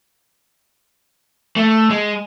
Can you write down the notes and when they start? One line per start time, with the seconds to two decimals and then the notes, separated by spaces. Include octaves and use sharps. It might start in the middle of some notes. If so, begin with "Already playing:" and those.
1.56 A3
1.90 G#3